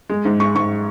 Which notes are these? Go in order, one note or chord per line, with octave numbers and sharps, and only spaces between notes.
G#3
G#2
G#3 C#6
G#2 C#6